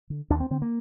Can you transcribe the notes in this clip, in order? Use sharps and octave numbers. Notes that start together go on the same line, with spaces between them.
D3
D#2 D4
C4
D3 C4
A#3